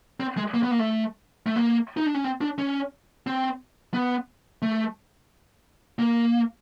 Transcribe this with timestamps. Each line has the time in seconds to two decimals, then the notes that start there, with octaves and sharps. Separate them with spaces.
0.20 C4
0.37 G#3
0.54 A#3
0.63 B3
0.71 A#3
0.79 A3
1.46 A3
1.56 A#3
1.97 D#4
2.06 D4
2.15 C#4
2.24 C4
2.41 D4
2.58 C#4
3.27 C4
3.94 B3
4.62 A3
5.99 A#3